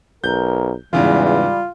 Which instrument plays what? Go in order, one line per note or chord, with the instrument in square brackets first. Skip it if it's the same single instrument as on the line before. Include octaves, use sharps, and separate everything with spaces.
[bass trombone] B1 [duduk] A#4 [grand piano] G6
[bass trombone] E2 [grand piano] G#2 C#3 E3 [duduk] G3 [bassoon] F4
[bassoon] F4